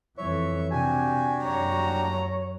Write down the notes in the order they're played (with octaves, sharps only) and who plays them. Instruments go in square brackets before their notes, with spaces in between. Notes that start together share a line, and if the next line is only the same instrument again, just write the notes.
[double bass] F2 E3 [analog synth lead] C#5 [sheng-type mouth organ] E5
[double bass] C3 [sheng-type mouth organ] D4 F#4 G4 [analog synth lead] G#5
[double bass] F#2 [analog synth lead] C#5 [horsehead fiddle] A#5